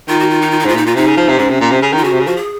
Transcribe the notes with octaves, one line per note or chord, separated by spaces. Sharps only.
D#3 F4
F#4
F4
D#4
F4
D#4
G#2
F4
A#2
D#4
A#2 F4
C3 D#4
C#3
F3
C3
G#2 C#4
C3
A#2
C3
C#3
D#3 F4
C#3 F#4
C3
C#3
F3 F#4
G#4